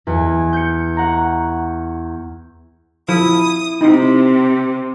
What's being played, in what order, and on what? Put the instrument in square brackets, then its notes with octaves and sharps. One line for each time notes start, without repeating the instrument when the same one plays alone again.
[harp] E2 G#5
G6 C#7
F#5 A#5 C#6
[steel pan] F3 [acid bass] E4 [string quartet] D#6
[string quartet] C3 [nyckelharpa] C4 G4 [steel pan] D#4